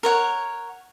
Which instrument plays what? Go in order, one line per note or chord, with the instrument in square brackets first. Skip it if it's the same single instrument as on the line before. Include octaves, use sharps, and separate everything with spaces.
[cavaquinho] A#4 C#5 F#5